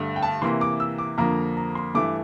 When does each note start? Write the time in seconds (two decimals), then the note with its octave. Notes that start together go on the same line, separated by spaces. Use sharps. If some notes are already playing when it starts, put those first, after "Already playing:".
Already playing: G2 D3 A3
0.16 G5
0.22 A5
0.42 C3 E3 A#3 C6
0.61 D6
0.80 E6
0.98 D6
1.18 F2 D3 F3 A#3 A#5
1.57 A#5
1.75 C6
1.95 G2 E3 A3 D6